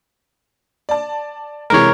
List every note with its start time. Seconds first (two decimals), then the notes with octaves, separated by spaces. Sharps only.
0.89 D5 A5
1.70 C3 E3 G#3 A#4 C#5